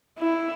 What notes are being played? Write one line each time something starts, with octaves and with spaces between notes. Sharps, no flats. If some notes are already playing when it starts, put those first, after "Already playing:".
E4